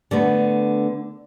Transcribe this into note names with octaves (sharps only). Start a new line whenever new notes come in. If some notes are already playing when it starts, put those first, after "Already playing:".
D3 A3 B3